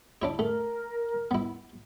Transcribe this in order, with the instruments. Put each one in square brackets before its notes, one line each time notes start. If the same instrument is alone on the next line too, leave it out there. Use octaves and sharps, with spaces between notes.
[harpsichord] D4 E4 C#5
[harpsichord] A3 [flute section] A#4
[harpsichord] B3 E4